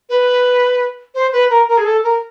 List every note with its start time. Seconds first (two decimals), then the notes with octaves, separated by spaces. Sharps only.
0.09 B4
1.14 C5
1.33 B4
1.50 A#4
1.69 A#4
1.77 G#4
1.85 A4
2.04 A#4